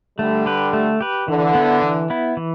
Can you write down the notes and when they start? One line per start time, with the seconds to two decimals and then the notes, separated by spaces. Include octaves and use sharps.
0.19 D3 G3 A3
0.46 G4 B4
0.73 A3
1.01 G4 B4
1.28 D3 E3
1.55 B3 E4
1.82 E3
2.10 B3 E4
2.37 E3